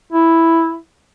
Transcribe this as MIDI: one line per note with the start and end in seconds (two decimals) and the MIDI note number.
0.12 0.76 64